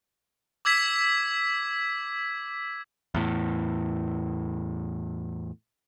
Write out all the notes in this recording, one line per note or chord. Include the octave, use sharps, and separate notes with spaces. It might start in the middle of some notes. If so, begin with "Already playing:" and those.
D6 E6 G#6 B6
E2 A2